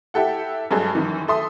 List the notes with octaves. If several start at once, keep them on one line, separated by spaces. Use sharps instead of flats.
E4 G4 A4 F#5
G2 F#3 G#3 G#4 A4
F#2 D#3 E3
A4 E5 C6 D#6